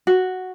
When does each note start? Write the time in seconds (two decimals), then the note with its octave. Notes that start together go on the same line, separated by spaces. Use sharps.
0.07 F#4